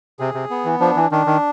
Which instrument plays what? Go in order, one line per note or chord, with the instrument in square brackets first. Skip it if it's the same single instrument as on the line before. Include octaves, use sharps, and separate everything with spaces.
[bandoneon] C3 [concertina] G#4
[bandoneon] C3
[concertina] B3
[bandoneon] E3
[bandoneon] F3 [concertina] D4
[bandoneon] E3
[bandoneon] D#3 [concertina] D4
[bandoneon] D#3